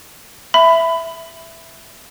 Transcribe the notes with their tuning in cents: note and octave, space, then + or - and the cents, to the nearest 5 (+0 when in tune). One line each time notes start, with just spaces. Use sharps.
E5 +0 B5 +20